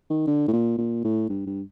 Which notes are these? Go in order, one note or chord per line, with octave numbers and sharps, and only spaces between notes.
D#3
D3
A2
A#2
A#2
A2
G2
G2